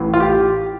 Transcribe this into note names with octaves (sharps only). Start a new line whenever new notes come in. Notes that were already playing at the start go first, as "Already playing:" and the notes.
Already playing: A1 A2 E3
F4
G4